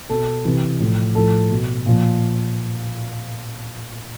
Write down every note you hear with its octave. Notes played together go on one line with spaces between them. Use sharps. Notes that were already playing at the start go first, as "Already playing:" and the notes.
B2 A4
C3 E3
A2 F3
A2 F3 A4
B2
A#2 F3